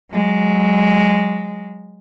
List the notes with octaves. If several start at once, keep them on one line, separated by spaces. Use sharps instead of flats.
F#3 G#3